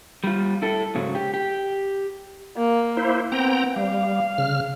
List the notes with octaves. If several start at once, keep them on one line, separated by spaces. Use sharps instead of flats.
G3 F4
E4 A4
G#2 C#3 F#3
G4
G4
A#3
E4 C5
B3 C4 G5 A#5
G3 F5
C#3 F6